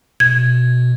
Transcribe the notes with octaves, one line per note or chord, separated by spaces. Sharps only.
B2 G#6